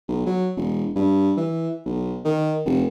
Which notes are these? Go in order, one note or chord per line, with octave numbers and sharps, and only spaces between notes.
B1
F#3
E1
G2
E3
B1
D#3
F1